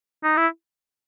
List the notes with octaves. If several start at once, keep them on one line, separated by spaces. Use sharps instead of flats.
D#4
E4